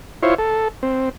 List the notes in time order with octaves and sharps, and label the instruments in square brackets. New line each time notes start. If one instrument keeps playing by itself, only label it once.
[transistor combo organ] E4 F4 C5 C#5
A4
C4